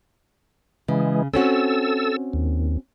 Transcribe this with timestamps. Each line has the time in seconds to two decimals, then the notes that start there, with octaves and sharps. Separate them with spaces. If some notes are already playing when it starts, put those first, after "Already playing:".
0.88 C#3 E3 G#3
1.34 C4 C#4 F#4 A4 E6
2.33 D#2